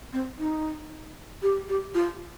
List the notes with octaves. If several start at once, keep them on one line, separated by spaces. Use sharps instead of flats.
C4
D#4
G4
G4
F4